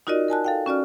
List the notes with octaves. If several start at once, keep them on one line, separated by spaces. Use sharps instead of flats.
D#4 F4 F#4 A#4 D5 D#5
A#4 G#5 A5 F#6
A4 F5 G5
C#4 F#4 D5 F6